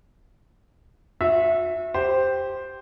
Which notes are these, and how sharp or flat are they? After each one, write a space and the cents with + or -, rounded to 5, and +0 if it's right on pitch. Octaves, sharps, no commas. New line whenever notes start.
F#4 -40 E5 +0
G4 +0 C5 +0